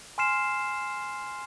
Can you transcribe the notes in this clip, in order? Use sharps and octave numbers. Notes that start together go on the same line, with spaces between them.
G#5 C6 F6 C7 E7